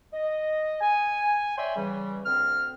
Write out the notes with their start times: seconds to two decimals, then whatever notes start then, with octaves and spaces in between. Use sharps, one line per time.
0.13 D#5
0.81 G#5
1.57 C#5 D5 E5 G5 G#5 C6
1.76 C#3 E3 G3
2.25 D2 C4 F6